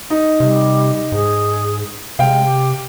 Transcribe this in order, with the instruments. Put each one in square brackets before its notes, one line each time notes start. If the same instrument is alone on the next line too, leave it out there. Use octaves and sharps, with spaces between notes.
[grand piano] D#4
[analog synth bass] C3 [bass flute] G3
[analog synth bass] G#2 [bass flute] G#4
[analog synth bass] C3 [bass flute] G#3 [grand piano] F5 G5
[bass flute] G4